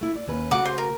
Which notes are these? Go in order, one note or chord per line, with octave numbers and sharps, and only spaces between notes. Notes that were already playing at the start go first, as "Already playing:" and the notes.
A3 E4
D5
D#2 C#4 B4
C#3 A3 F#4 F#5 D6
C5
A#4